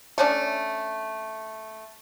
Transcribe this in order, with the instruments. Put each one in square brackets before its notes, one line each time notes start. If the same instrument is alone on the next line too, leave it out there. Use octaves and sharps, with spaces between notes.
[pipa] A3 C#4 D4